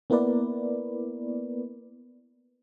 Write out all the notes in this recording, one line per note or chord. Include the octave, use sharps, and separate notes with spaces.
A#3 B3 E4 A#4 B4 D5